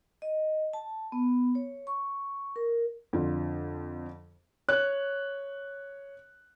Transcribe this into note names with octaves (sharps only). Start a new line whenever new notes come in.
D#5
A5
B3
C#5
C#6
A#4
F2 D3 F4
C#5 F#6